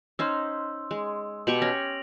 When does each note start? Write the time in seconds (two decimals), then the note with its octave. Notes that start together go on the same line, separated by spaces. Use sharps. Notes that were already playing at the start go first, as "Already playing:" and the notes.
0.19 C#4 D#4 C5 C6 E6
0.91 G#3
1.47 B2 G4 C#6 D7 F7 F#7
1.62 C#4 A#6